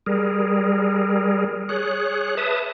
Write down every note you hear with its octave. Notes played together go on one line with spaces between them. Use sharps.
G3 G#4 A#4
G#4 C#5 F#6
B4 E5 A5 D#6